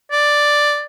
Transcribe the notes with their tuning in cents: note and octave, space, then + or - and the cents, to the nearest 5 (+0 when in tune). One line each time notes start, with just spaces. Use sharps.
D5 +0